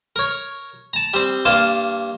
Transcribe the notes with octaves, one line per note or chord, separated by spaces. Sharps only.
A#4 C#5
A5 A#5
G3 C4
G2 A#3 F5 A5 C6